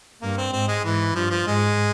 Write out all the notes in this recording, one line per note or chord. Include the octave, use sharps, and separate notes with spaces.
G2 A#3
C4
G#2 C4
G#3
G#2 E3
G2 F3
F3
G#2 G#3